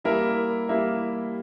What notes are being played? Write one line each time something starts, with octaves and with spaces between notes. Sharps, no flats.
G3 A#3 E4 A#4 E5
G3 A#3 E4 A#4 E5